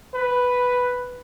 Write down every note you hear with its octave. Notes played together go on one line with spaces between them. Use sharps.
B4